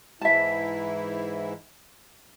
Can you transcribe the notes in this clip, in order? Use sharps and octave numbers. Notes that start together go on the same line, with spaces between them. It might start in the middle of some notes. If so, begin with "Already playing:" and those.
G#2 E3 E4 E5 A5